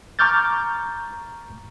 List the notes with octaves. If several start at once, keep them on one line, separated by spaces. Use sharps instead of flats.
A#5 C#6 D6 F6 G6 A6